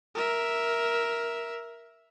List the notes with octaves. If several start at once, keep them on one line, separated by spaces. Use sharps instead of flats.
A#4 E5